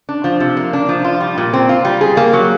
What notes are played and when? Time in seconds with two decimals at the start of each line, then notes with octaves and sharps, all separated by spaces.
0.09 D4
0.24 F3
0.40 C3
0.57 A#3
0.73 D4
0.89 F3
1.05 F4
1.20 G3
1.38 A#2
1.54 C4
1.69 F4
1.85 G3
2.01 G#4
2.17 A#3
2.33 F#3